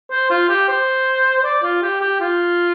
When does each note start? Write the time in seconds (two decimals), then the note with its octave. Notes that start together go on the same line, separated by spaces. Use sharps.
0.11 C5
0.30 F4
0.49 G4
0.68 C5
1.38 C5
1.44 D5
1.63 F4
1.82 G4
2.01 G4
2.20 F4